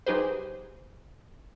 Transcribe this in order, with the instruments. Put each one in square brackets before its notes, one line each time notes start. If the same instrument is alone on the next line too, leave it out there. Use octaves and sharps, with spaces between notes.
[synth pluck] F#3 D#4 G4 G#4 B4 C5